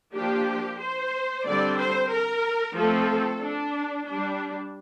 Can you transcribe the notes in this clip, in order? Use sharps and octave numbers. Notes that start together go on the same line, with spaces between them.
F3 A#3 D4 G4
C5
D3 G3 C4 D5
C5
A#4
F3 A3 C4 A4
D4
G3 D4